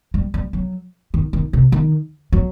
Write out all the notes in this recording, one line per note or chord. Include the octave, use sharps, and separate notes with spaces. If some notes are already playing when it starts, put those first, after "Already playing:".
G3
G3
F#3
D#3
D#3
C3
D#3
F#3